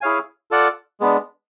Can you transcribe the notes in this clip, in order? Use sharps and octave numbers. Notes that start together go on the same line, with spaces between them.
E4 G#4 C#5 F5 G#5
F4 A4 D5 F#5
G#3 B3 D4